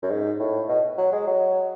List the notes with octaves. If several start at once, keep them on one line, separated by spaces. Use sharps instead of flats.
F#2
G#2
A2
B2
F#3
G#3
F#3